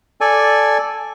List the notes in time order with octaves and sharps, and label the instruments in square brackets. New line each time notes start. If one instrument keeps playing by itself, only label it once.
[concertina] A4 D5 G#5